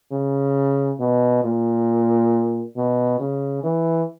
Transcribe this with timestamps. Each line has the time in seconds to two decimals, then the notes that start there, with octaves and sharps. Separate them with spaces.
0.12 C#3
1.00 B2
1.43 A#2
2.76 B2
3.19 C#3
3.63 E3